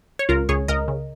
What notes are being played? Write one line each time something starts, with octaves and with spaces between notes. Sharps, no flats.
C#5
C#2 F4 A#4
C#2 G#4 C#5
C#2 A#4 D#5
C#3